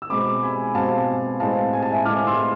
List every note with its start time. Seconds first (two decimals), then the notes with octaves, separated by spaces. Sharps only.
0.02 E6
0.09 B2 G#3 C4 B5 D6
0.43 G#5 B5
0.75 B2 G#3 C4 F5 A5
1.40 A2 G#3 C4 F5 A5
1.73 G#5
1.83 A5
1.92 E5 G#5
2.05 A2 G#3 C4 D6 F6
2.27 C6 E6